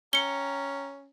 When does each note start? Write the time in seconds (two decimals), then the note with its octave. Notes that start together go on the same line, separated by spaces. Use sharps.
0.13 C#4 G5 A#5 C#7 G7